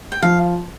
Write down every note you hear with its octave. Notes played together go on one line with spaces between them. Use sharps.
G5
F3 F5